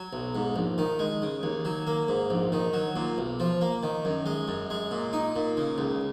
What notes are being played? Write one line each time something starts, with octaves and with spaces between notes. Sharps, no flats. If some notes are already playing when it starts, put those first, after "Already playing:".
Already playing: F#3
B1
G#2
A#1
D#3
G#3
C#3
D#2
F#3
A#3
G#2
A#1
D#3
F#3
A#2
B1
F3
A#3
D#3
F#2
G#3
F#2
G#3
A#2
D#4
A#2
C#3
C#2